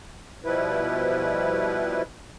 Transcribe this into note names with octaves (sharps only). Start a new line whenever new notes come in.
B2 F3 G3 E4 B4